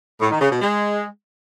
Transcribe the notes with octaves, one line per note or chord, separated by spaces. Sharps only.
A2
D#3
C#3
B2
G#3